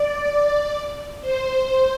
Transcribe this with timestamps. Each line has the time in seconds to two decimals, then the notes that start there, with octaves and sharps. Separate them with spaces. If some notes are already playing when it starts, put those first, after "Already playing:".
Already playing: D5
1.21 C5